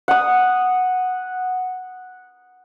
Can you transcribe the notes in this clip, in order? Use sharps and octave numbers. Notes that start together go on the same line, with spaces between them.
F#5 D#6